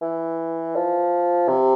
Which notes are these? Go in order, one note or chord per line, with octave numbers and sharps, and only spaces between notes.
E3
F3
C3